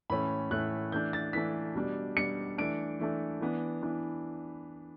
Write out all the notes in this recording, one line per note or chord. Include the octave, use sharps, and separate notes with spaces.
A2 E3 A3 C#4 B5
A2 E3 A3 C#4 F#6
E3 A3 D4 G6
A6
E3 A3 D4 B6
B2 G3 D4
B2 G3 D4 C#7
E3 A3 D4 D7
E3 A3 D4
E3 B3 D4
E3 B3 D4